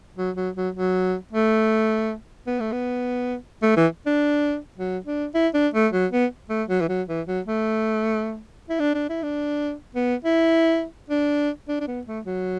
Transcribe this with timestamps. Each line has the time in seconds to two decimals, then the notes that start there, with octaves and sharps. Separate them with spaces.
0.17 F#3
0.36 F#3
0.56 F#3
0.75 F#3
1.33 A3
2.47 B3
2.60 A3
2.72 B3
3.62 A3
3.77 E3
4.06 D4
4.78 F#3
5.06 D4
5.34 E4
5.54 D4
5.74 A3
5.93 F#3
6.12 B3
6.50 A3
6.69 F#3
6.81 E3
6.89 F#3
7.08 E3
7.27 F#3
7.46 A3
8.69 E4
8.79 D4
8.94 D4
9.09 E4
9.23 D4
9.95 B3
10.24 E4
11.10 D4
11.68 D4
11.80 D4
11.87 B3
12.07 A3
12.25 F#3